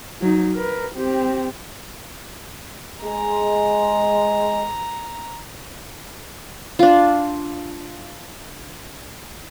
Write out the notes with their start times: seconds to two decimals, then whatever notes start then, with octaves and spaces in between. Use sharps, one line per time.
0.22 F#3 D#4
0.55 A#4 B4
0.96 C4 G4
3.04 G#3 A#5
6.79 D4 F4